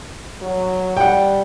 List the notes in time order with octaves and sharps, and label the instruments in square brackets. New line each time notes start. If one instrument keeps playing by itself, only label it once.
[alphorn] F#3
[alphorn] G3 [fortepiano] F#5 G5